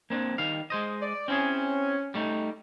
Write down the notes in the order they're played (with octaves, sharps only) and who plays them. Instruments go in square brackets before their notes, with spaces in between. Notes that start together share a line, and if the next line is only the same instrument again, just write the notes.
[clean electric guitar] A#3 C4 D4
D#3 G3 F5
G#3 C5 D#5
[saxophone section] D5
[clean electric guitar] C4 E4 G#4 [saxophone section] C#4
[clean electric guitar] G3 A3 D#4